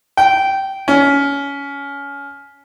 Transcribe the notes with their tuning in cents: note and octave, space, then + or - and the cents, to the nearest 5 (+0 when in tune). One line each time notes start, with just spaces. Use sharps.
G5 -15
C#4 +20